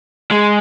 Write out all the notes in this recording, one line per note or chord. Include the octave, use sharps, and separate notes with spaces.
G#3